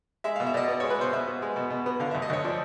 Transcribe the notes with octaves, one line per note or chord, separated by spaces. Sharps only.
G#3 E5
B2 F5
E5
B2 D5 D#5
B3 D5
G#3 C#5
B4
B2 C5
B2 E5
B3
G#3
B2
B2
B3
D3 F5
D2 E5
D#5
D2 C#5
F3 D5